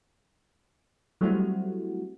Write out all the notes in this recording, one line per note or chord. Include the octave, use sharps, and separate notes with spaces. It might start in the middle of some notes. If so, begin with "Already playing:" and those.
F#3 G3 A3 C4 E4 F#4